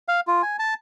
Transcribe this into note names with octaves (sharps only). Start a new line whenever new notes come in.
F5
F4
G#5
A5